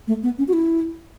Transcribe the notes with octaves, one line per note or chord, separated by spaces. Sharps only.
A3
B3
C#4
F#4
E4